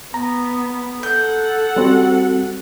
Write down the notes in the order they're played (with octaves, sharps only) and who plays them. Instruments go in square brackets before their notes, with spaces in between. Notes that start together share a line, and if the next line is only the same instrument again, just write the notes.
[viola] B3 [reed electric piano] A#5
[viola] A4 F#5 [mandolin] G6
[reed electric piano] G3 C4 F#4